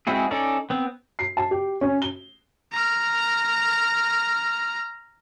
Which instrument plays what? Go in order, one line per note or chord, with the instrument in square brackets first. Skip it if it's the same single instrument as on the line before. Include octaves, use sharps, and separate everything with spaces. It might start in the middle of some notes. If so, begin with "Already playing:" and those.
[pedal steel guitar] G#3 C4 E4 F#4 G#4
C#4 D#4 A4 D5
B3 C4
[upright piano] C7
A5
G4
C#4
G7
[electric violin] A#5 F6